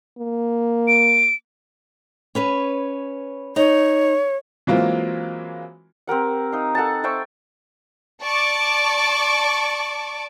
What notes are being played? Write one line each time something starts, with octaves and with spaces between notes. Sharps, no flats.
A#3
D7
C#4 B4 C#5
D#4 C#5
E3 F#3 G#3 A#3 C4 F4
C4 G4 A#4 F#5
D#4 F5
A4 F#5 G#5 A5
C5 E5 G5 C#6
D5 A5 C#6 D6